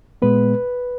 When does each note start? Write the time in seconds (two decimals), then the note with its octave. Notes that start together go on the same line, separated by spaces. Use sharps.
0.22 A#2 G#3 B3 B4